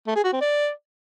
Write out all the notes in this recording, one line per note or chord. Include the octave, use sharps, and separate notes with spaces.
A3
G#4
F#4
C4
D5